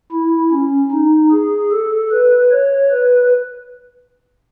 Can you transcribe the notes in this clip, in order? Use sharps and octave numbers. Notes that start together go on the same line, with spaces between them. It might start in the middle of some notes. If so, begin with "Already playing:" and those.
E4
C#4
D#4
G#4
A4
B4
C#5
B4